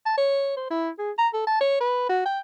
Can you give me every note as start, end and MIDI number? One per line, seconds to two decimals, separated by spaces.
0.06 0.16 81
0.18 0.53 73
0.57 0.68 72
0.71 0.90 64
0.99 1.11 68
1.18 1.28 82
1.34 1.43 69
1.47 1.58 81
1.61 1.78 73
1.81 2.08 71
2.09 2.21 66
2.26 2.40 79